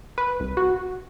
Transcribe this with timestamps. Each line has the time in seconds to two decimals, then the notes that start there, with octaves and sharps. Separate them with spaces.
0.18 B4
0.40 C2
0.57 F#4